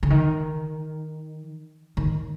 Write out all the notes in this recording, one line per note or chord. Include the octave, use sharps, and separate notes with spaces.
D3
D#3
D#3